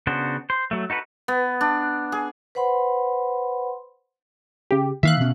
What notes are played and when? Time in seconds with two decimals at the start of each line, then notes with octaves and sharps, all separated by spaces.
0.07 C#3 B3 D4 F#4 C5
0.50 C5
0.71 F#3 A3
0.90 D#4 F#4 A4 B4
1.28 B3
1.61 D4
2.12 G#4
2.55 B4 C5 F#5 B5 C6
4.71 C#3 G4
5.03 D#3 E3 A#3 E5 F5 F#6
5.20 B2 C#4